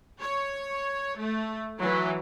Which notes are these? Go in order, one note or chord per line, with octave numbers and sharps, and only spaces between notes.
C#5
A3
E3 F#3